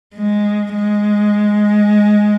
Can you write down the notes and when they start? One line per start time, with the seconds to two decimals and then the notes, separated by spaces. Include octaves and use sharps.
0.15 G#3
0.74 G#3